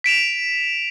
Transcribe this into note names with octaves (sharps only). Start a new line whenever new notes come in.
B6 D7 E7 F7